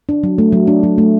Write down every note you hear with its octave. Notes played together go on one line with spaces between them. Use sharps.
D4
F#3
A3
F#3
D4
F#3
A3